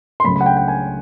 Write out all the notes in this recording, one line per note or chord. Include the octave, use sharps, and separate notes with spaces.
C6
C#2 C#3 F#3 A3 B5
B5
F#5
G5
G5
G#5